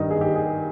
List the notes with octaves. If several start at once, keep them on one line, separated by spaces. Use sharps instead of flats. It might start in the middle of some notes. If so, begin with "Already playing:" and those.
Already playing: G2 D#3 D#4
G#4
G4
G#4